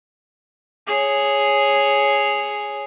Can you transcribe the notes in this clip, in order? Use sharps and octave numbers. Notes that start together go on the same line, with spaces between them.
G#4 C#5